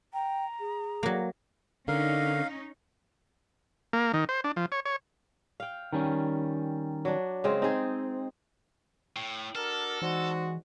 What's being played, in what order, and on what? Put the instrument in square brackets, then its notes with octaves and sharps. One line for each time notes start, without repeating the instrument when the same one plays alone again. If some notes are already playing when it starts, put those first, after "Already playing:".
[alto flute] G5 [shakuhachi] A#5
[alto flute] G#4
[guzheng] F#3 A#3
[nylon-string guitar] D3 A#4 [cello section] C#4 D#4 [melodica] F5
[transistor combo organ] A#3
D#3
C5
D4
F3
C#5
C#5
[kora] F5 G5
[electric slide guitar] D#3 G3 C#4
[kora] F#3 D4
C#3 G#3 C4
[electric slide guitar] C4 [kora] D#4 G#4
[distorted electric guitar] A2 [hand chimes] G5
[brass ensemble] D4 F#4 A#4 [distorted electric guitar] A4 [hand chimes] F6 A6
[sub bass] E3 [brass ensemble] G#3 F#4 [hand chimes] D#4 C5 D5